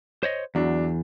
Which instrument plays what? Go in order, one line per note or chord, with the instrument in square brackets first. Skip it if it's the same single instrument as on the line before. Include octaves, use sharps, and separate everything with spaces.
[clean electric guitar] C5 C#5 D#5
[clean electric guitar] E2 [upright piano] F#3 D4